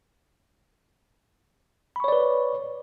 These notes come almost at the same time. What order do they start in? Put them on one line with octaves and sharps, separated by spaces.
B5 C#6 C#5 D5 B4